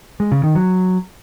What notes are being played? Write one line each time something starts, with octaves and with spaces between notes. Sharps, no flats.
G#3
C#3
D#3
F#3